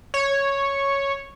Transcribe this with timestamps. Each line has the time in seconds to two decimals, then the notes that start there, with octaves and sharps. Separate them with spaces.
0.14 C#5